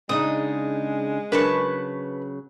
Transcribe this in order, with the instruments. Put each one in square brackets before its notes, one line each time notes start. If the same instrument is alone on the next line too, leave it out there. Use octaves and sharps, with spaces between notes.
[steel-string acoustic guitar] C#3 D4 D#4 [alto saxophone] G#3 [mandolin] D#6
[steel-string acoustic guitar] C#3 F#3 [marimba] D4 A#4 [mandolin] B4 A5 C#6